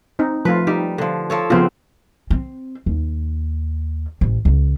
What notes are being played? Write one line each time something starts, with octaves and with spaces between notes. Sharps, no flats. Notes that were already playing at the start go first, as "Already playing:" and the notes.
C4 D#4
F3 A3 F4 B4
G3 D#4
D3 F3
F3 A4 C#5
C#3 F3 B3 C4 F4
C4
D#2
A1
C#2